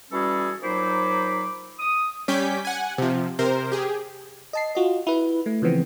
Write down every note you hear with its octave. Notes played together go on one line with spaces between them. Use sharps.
E3 G3 C#4 F#4 G#4 A4
A#2 F#3 D#4 C5 B5 D6
D#6
G3 C#4 G#5 D6 G6 B6
F#5 G#5
C3 F3
C3 A#4 C5
G4 G#4
D#5 A5 C7
F4 F#4 D#5
E4 B4
A3
C#3 E3 F3 B3 C4